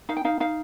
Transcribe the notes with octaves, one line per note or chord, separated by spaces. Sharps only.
D#4 F5
G5
D#4 F5
D#4 F5